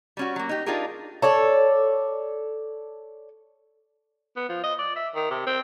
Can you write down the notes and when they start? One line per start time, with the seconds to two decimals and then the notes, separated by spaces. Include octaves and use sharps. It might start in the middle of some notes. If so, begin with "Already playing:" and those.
0.17 G3 C#4 F#4
0.36 F#3 A#3
0.49 D#4 G4
0.66 D4 D#4 F4 G4 G#4 A#4
1.22 A4 C#5 D5
4.36 B3
4.49 F3
4.64 D#5
4.79 D5
4.96 E5
5.15 D#3
5.31 C3
5.47 C4